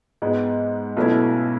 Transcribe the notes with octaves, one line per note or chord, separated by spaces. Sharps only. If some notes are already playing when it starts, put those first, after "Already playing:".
G#2 G#3 B3
B1 B2 A3 C#4 E4